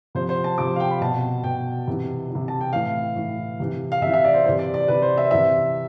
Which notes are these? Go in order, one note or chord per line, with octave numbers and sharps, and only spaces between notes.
C3 F3 C5
C5
A5
C3 F3 D6
F5
G5
B5
B2 A5
B2 G5
C3 E3
E3
C3
A5
G5
A2 E3 F5
A2 E3
C3 E3
F5
C3 E3 E5
E5
D5
C5
C3 E3 C5
D5
D5
C3 E3 B4
C5
E5
C3 E3 E5